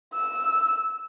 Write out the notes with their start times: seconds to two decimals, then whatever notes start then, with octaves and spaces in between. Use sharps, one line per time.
0.14 E6